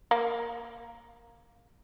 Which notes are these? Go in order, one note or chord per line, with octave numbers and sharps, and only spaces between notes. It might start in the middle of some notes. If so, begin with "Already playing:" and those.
A#3